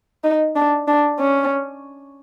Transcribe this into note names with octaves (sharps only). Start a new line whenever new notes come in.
D#4
D4
D4
C#4